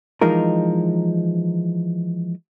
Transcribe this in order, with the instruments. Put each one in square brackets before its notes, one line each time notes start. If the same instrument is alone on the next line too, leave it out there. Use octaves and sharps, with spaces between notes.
[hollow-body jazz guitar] E3 F3 G#3 D#4 A#4